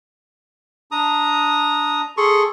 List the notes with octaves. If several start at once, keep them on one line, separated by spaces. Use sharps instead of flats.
D4 A#5 D#6
G#4 A4 C6 C#6